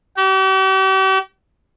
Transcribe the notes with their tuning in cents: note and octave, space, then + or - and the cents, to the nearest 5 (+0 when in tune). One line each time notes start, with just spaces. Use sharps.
G4 -45